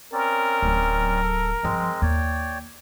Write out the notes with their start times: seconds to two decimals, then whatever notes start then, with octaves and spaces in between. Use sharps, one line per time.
0.13 C4 C#4 A#4 D5
0.62 D1 F#3
1.22 A4
1.63 G2 F3 G#3 C4 D#5
2.02 D#2 C#5 D5 G5